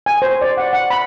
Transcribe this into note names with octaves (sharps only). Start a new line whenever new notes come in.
G#5
C5
D5
F#5
F#5
B5